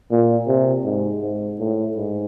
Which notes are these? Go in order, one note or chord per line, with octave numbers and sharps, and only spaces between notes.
A#2
C3
G#2
G#2
A2
G#2